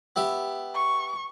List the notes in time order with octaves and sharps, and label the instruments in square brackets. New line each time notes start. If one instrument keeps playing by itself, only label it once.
[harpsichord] B3 G4 E5
[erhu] C#6